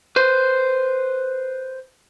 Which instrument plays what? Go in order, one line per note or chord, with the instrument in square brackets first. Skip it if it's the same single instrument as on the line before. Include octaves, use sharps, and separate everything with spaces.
[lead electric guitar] B4 C5